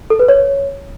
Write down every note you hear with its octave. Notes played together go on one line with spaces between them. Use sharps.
A4
B4
C#5